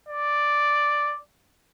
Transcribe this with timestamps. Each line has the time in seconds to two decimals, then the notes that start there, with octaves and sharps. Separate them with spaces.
0.09 D5